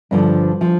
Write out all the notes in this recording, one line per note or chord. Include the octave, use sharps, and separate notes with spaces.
G2 D3 F3
F3